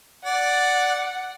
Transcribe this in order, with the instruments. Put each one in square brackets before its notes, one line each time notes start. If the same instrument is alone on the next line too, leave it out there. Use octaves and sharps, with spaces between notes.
[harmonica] D5 [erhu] F#5